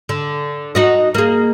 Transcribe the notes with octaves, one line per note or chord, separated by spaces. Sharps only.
D3
D#4 F#4 D#5
A#3 G#4